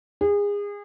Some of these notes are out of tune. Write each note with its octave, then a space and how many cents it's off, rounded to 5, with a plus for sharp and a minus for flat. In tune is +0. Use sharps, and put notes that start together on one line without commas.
G#4 -30